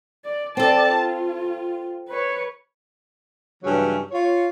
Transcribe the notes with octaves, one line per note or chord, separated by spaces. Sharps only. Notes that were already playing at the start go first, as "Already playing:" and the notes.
D5
C4 A4 D5 A5
F4
B4 C#5
G2 C#3 E3 F#3 C#4
F4 C#5